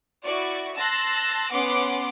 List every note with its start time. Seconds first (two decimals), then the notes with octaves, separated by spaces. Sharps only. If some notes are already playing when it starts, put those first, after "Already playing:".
0.24 E4 F#4 D5 C#6
0.76 A5 C6 E6 F#6 A#6
1.52 B3 C#4 F#5 C6 D6